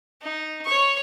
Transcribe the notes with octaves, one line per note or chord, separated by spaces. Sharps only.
D#4
C#5 C#6